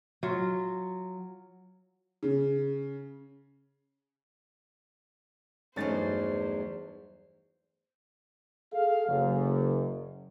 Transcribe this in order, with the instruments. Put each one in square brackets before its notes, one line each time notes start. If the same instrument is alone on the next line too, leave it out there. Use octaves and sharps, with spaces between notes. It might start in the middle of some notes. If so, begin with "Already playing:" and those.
[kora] F#3 F4
[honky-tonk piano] C#3
[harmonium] E2 [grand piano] G2 C#4 A6 [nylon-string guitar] F#3 A3 D#4 [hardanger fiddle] C5
[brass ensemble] G#4 A4 F5
F#1 F#2